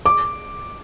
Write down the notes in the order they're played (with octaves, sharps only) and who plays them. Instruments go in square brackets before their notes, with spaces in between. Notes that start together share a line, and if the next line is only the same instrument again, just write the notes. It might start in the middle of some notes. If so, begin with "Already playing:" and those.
[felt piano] D6